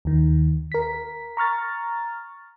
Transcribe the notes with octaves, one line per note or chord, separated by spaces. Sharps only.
D#2 D#3
A#4 B6
A#5 C#6 F6 A6